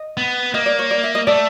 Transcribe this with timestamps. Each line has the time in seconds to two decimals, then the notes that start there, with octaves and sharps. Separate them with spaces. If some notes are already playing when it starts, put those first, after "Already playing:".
Already playing: D#5
0.17 B3
0.54 A#3 D#5
0.66 D5
0.79 C#5
0.91 D5
1.03 E5
1.15 D#5
1.27 A3 D5